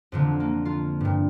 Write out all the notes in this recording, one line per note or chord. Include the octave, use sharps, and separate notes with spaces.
F2 A#2 D3
A#3
F4
G2 A#2